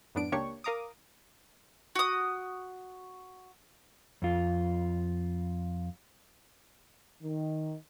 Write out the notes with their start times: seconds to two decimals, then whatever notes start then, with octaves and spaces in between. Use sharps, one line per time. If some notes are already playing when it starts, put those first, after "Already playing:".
0.15 F#2 A2 B3 D4 D7
0.32 C#2 A#3 D4 G4 C#5 C#6
0.64 A#4 F5 A#5 D6 D#6
1.95 F#4 D#6
4.22 F2 F4
7.23 D#3